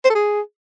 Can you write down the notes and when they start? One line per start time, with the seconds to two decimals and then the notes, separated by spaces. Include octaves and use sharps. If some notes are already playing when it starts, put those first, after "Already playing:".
0.05 C5
0.10 A4
0.15 G#4